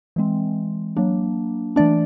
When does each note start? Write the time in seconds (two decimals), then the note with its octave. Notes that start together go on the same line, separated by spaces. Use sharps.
0.16 E3 G#3 C4
0.97 F#3 A#3 D4
1.76 E3 A3 D4 D5